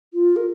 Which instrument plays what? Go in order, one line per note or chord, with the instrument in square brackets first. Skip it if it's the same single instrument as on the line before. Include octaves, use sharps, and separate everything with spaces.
[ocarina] F4
A#4